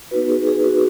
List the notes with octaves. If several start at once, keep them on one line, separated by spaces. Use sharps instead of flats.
B3 D#4 F#4 B4
G#4
G#4
F#4